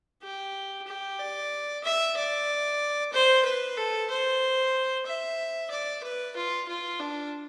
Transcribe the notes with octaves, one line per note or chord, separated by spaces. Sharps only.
G4
G4
D5
E5
D5
C5
B4
A4
C5
E5
D5
B4
F4
F4
D4